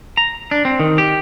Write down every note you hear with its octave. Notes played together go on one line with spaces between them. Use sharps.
A#5
D4
C4
D#3
G4